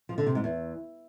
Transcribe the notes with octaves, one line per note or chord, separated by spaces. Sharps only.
F3
D3
C3
G#2
E2